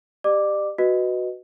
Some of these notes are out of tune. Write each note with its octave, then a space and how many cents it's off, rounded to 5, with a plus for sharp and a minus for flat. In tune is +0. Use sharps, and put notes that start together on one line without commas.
G4 +10 D5 +40 D6 +0
F#4 +0 B4 +0 D#5 +0